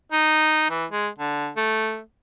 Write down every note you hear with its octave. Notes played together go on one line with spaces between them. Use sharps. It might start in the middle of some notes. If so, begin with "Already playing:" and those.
D#4
E3
G#3
D3
A3